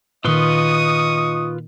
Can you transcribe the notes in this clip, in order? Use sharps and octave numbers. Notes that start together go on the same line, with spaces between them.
A#2 D#3 F4 B4 D#5 C6 C#6 D#6